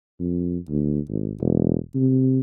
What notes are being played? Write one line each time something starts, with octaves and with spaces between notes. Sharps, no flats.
F2
D2
G#1
E1
C3